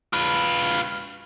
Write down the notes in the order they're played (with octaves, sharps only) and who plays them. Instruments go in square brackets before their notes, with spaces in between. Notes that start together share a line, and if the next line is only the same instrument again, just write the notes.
[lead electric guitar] F4 B4